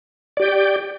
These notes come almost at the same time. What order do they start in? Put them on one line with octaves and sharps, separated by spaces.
D5 G4 G5